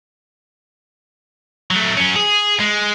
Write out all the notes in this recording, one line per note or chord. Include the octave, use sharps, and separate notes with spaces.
F#3 A3
F#3 C#4
G#4
G#3